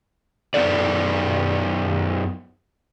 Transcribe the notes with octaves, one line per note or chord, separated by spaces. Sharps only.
F#2 B3 D#4 A4 D5